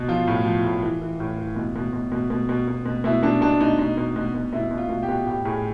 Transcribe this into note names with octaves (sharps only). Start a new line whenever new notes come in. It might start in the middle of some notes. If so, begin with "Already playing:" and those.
Already playing: B2
F3 F4
A2
F3
A2
E3
E3
A2
E3
B2
B2
B2
B2
B2
B2
B2
B2
B2 E4
B2 D4
B2 D4
B2 D#4
B2
B2
B2
B2
B2 E4
B2
F4
B2
G4
B2
A2 G4
A2 G#4